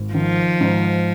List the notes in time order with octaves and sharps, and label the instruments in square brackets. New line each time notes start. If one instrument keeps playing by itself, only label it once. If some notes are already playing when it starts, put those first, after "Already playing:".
Already playing: [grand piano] G#1
[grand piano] D#3 [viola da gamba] F3
[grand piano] G#2